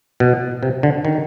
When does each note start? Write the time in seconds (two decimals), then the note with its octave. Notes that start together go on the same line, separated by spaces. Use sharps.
0.20 B2
0.63 C3
0.83 D3
1.05 D#3